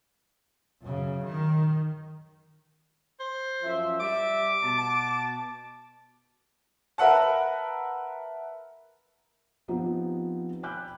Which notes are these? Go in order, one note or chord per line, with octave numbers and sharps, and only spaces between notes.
F#2 C#3
D#3
C5
F#2 F3 E5
G3 E5 D6
B2 A5
A#4 B4 E5 F#5 A5
F3 B3 C4 D#4 F4 G4
G5 G#5 B5 D6 F#6 G6